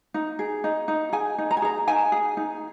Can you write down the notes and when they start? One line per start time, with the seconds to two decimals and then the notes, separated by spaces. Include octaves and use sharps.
0.14 D#4
0.39 G#4
0.64 D#4
0.88 D#4
1.13 G#4 G#5
1.38 D#4
1.51 A#5
1.57 G#5
1.62 G#4 A#5
1.88 D#4 G#5
2.12 G#4
2.37 D#4